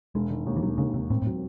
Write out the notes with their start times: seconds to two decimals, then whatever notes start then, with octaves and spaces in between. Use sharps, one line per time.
0.15 E1 G#3
0.30 D#3
0.47 D#2
0.57 E3
0.62 E1 F#3
0.78 D#2 C#3
0.94 E1 C3
1.10 A2 C4
1.22 A2
1.26 F#3